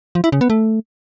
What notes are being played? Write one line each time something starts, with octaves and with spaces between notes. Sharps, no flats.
F3
E4
C#3
B3
A3